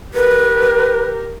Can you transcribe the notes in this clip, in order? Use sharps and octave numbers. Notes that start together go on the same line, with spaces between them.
G4 A#4 B4